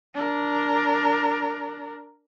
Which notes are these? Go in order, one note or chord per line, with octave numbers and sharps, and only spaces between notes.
D4 A#4